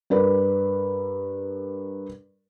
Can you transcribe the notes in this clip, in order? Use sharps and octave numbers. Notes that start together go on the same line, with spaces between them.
G2 A#4 B4 D5